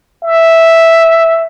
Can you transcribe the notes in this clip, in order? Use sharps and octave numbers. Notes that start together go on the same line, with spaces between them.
E5